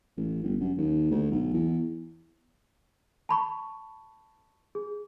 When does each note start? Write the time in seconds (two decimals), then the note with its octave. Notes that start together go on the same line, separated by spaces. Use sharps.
0.17 A1
0.43 G1
0.60 F#2
0.77 D#2
1.11 D2
1.31 B1
1.53 E2
3.29 A5 B5 C#6
4.75 G#4